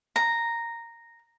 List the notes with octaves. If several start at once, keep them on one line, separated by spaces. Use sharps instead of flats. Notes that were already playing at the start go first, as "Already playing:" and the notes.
A#5